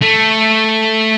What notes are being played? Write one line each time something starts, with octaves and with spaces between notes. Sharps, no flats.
A3